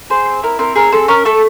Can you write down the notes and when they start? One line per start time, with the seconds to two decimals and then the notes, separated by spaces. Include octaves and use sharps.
0.10 G#4 C5
0.26 C4
0.43 E4 A#4
0.59 C4 A#4
0.75 G#4 A#4
0.92 C4 A4
1.08 C#4 A#4
1.25 A3 A4